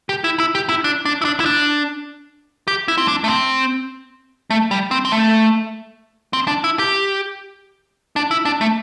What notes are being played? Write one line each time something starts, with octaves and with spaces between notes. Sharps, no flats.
G4
E4
E4
G4
E4
D4
D4
E4
D4
E4
D4
G4
E4
C4
D4
A3
C4
A3
G3
C4
C4
A3
C4
D4
E4
G4
D4
E4
D4
A3